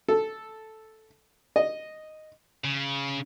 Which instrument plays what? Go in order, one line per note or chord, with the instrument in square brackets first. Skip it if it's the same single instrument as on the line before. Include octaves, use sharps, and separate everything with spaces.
[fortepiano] A4
D#5
[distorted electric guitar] C#3